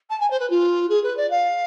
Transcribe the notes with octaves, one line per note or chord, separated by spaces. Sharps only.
A5
G#5
C5
B4
F4
G#4
B4
D5
F5